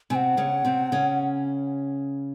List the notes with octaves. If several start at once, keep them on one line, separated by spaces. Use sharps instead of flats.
C3 C4 G#5
F#5
C#3 C#4
C3 C4
C#3 C#4